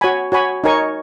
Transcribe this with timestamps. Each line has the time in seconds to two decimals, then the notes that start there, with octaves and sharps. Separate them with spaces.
0.01 F#4 C#5 G#5 B5
0.32 F#4 C#5 G#5 B5
0.64 D#4 A#4 C#5 G#5 C#6